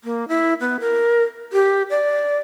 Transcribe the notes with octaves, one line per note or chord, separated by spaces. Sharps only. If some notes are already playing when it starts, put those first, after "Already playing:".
A#3
E4
B3
A#4
G4
D5